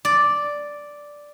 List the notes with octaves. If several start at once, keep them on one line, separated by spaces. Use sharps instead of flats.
D5